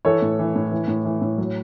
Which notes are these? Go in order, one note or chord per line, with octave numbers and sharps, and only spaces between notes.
E3 A4 C#5
A2
E3
A2
E3
A2
E3
A2
F#3